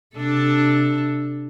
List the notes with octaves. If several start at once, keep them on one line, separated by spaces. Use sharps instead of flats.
C3 D4 A4